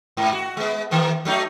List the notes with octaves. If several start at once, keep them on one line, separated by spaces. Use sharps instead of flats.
G#2
F#4
G#3 B3
D#3 E3 A#3
F#3 A3 D#4